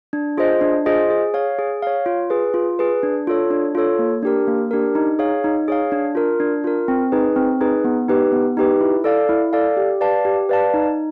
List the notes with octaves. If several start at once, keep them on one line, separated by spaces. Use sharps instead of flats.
D4
F4 G#4 C5 D#5
D4
F4 G#4 C5 D#5
G#4
C#5 F5
G#4
C#5 F5
F4
G#4 B4
F4
G#4 B4
D4
F4 A4 C#5
D4
F4 A4 C#5
A#3
D4 G4 A#4
A#3
D4 G4 A#4
D#4
G#4 C#5 F5
D#4
G#4 C#5 F5
D4
F4 A#4
D4
F4 A#4
C4
D#4 G#4 B4
C4
D#4 G#4 B4
B3
D#4 G4 B4
B3
D#4 G4 B4
E4
A4 D5 F5
E4
A4 D5 F5
G4
B4 D5 F5 A5
G4
B4 D5 F5 A5
D#4